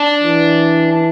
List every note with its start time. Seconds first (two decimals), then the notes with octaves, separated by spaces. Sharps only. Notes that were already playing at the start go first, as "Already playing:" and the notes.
Already playing: D4
0.23 E3